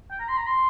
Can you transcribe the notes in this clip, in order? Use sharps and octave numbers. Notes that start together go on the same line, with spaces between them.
G5
A#5
C6
A#5
C6